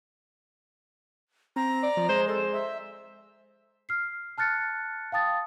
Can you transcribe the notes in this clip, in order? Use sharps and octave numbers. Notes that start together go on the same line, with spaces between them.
C4 A#5
D5
F3
G#3 C5
A4 C5
E5
F6 C7
A5 F6 F#6 A6 C#7
F5 G5 A5 D#6 A6